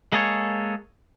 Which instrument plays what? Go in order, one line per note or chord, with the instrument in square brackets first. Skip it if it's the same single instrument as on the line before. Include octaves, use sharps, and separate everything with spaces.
[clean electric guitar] G#3 A#3 G#4 A4 C#5